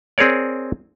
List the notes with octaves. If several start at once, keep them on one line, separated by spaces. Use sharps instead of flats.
C4 G#4 A#4 C#5 D5